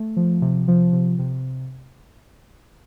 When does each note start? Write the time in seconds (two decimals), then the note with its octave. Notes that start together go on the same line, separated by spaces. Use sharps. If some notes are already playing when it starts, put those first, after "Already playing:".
Already playing: A3
0.17 F3
0.42 C3
0.68 F3
0.93 C3
1.19 C3